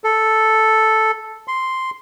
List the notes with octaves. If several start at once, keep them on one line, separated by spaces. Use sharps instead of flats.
A4
C6